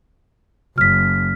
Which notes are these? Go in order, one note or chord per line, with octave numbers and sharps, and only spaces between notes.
F#1 F6 B6